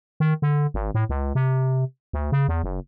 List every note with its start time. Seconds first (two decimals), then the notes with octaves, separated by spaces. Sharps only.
0.20 D#3
0.42 D3
0.74 G#1
0.94 A2
1.09 C#2
1.35 C3
2.13 D2
2.32 C#3
2.48 E2
2.64 F#1